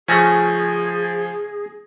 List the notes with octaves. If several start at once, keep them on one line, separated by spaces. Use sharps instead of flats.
C#3 F3 A3 C#4 G#4 G#5 A#6